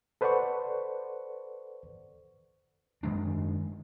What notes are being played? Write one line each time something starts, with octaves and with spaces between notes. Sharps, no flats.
A4 B4 C5 D5 F#5 C#6
F#2 D#3 G#3 D4